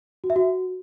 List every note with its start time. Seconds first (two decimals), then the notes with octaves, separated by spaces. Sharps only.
0.24 F#4
0.30 E5
0.36 F#4